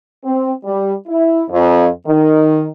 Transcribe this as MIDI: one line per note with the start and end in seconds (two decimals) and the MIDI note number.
0.25 0.52 60
0.65 0.95 55
1.08 1.44 64
1.50 1.87 41
2.07 2.67 51